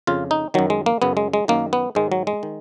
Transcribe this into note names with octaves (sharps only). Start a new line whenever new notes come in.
F2 C#3 F4
D#4
F#2 D#3 F#3
G#3
A#3
F#2 C#3 B3
G#3
G#3
F#2 D#3 A#3
B3
G#2 D#3 G#3
F#3
G#3
D#3